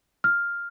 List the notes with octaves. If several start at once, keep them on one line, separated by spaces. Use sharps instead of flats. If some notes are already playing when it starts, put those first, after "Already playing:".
F6